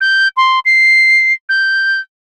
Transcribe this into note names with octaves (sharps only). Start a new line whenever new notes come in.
G6
C6
C7
G6